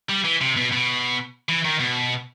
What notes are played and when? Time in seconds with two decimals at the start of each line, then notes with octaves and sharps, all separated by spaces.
0.09 G3
0.25 E3
0.41 C3
0.57 B2
0.72 B2
1.49 E3
1.65 D#3
1.80 B2